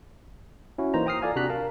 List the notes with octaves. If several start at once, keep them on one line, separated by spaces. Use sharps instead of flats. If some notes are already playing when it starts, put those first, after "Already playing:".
C#4 E4 F#4
E3 A#3 D#4 C5 A#5
G5 A#5 D#6 F6 C7
F4 A4 D5 F5 G#5 A#5
C3 D4 F#4 A#5 F#6 B6
A#4 F5 A5